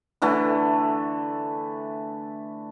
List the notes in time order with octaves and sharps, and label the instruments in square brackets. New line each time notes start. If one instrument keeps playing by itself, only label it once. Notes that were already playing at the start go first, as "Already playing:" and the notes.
[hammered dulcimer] D3 E3 A3